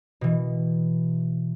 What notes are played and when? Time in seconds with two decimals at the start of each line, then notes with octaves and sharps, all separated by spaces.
0.21 B2 E3